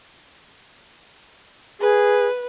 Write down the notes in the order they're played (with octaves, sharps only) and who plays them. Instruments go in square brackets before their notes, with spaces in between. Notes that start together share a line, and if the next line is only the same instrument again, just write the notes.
[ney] G#4 [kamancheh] B4